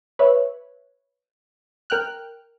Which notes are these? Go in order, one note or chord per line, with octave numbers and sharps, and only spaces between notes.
B4 C#5 E5
A#4 G5 F6 F#6